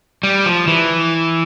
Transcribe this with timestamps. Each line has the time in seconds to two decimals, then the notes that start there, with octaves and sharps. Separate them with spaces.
0.23 G3
0.46 F3
0.68 E3